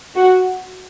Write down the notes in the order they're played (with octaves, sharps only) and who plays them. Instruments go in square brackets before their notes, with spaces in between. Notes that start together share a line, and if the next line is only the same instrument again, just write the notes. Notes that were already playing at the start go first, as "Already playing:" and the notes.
[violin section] F#4